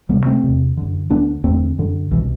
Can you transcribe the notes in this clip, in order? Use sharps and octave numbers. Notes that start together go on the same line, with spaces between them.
D2 C3 G3 B3
A3 C4
E2 C3
F#2 D3
D2 D3 B3 D4
E2 D3 A3 C4
F#2 D3
C2 B2 E3